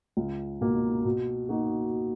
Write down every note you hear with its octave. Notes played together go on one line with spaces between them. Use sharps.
C#2
B2 A#3
B2
A#3 D#4 F#4